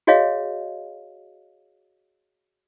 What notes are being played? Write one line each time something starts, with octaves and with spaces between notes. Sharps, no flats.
F#4 G#4 C#5 D#5 F5